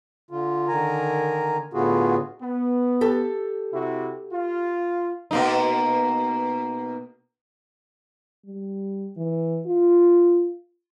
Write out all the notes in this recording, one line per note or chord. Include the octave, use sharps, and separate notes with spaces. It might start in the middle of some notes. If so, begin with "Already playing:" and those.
D3 F4
D3 D#3 A#4 G#5 A#5
A2 D3 B3 F4 F#4 G#4
B3
G4 A4 A5
C3 E4 F#4
F4
B2 A#3 D#4
G3
E3
F4